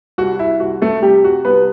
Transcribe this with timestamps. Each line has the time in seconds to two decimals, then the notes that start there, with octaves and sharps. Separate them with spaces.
0.18 C2 F#4
0.39 E4
0.60 C2 F#4
0.82 A3 A4
1.02 C3 G3 G4
1.24 F#4
1.45 C2 B3 B4